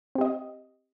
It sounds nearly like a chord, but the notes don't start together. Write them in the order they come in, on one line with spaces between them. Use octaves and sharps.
C4 G4 D#5